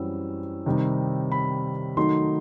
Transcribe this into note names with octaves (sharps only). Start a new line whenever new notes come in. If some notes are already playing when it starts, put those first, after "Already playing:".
Already playing: F#2 E3 G3 C4 E6
C3 D#3 G3 D#4
B5
D#3 F#3 A3 D#4 C6